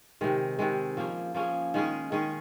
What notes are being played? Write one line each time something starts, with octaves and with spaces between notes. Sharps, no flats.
C3 D#3 G#3
C3 D#3 G#3
F3 A#3 C#4 G#4
F3 A#3 C#4 G#4
D#3 G#3 C#4 G#4
D#3 G#3 C#4 G#4